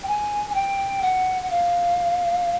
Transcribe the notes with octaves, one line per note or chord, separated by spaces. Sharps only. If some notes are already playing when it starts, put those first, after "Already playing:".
G5
G#5
G#5
G5
F#5
F#5
F5